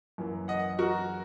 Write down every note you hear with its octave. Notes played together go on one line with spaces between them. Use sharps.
F#2 E3 A#3
D#5 F#5
F#4 A#4